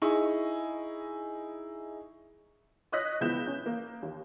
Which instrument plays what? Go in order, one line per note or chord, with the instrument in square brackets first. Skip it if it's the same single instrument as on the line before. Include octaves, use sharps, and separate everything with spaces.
[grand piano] D#4 E4 G#4 D#5 C#6
[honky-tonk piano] C#5 D#5 D#6 F#6 A#6 B6
C#2 F3 B3 E4 G6 E7
C#4
A#3
D#2